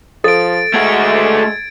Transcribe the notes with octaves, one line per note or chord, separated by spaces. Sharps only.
F3 A4 A6 D7
G#3 A3 F#4 G#6 D7